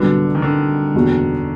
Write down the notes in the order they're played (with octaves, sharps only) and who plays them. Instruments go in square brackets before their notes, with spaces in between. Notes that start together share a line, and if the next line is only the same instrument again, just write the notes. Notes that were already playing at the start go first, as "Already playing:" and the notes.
Already playing: [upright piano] C2 B2 F#3 B3 [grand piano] D3
[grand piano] D#3
D3
[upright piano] F#1 E2 B2